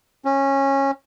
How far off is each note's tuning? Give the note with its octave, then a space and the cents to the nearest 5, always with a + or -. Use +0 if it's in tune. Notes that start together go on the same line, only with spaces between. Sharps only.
C#4 -15